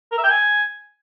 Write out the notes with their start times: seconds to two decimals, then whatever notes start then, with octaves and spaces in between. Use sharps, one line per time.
0.12 A#4
0.18 E5
0.24 G5
0.30 G#5